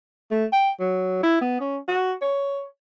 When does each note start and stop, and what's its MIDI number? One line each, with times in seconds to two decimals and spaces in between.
0.31 0.44 57
0.52 0.70 79
0.80 1.21 54
1.23 1.37 64
1.41 1.60 59
1.60 1.77 61
1.88 2.12 66
2.21 2.65 73